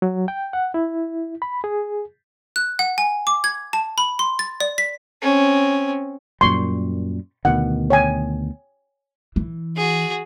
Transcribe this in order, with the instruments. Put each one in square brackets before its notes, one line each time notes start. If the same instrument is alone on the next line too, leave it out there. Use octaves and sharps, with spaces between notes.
[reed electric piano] F#3
G5
F#5
E4
B5
G#4
[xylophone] F#6
F#5
G#5
D6
G#6
A5
B5
C6
A6
D5
B6
[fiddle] C4 C#4
[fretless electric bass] F#2 A#2 G3 [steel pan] C6 C#6
[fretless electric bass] D2 B2 D#3 [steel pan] F#5
[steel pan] C#5 G5 G#5
[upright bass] E3
[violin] F#4 G#4